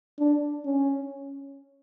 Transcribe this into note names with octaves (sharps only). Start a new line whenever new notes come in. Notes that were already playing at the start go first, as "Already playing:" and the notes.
D4
C#4